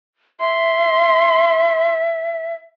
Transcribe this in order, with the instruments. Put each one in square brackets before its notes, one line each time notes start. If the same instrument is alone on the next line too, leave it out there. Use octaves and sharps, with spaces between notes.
[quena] E5 [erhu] C6